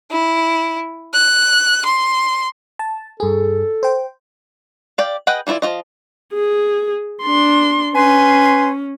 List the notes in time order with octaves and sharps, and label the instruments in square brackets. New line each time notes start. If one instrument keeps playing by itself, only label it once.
[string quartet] E4
F#6
C6
[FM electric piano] A5
[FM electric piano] G2 G#4 [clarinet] A4
[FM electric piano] C5 G5
[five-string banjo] G4 D5 F5
G#4 B4 D#5 F#5 G5
E3 A#3 E4 F4 D5
F3 A#3 F4 D#5
[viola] G#4
D4 C6
[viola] C#4 [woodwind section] B4 G#5 C6